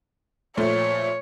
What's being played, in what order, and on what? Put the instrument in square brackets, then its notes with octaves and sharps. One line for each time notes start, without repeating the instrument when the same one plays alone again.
[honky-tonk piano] A#2 F3 A3 [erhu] C#5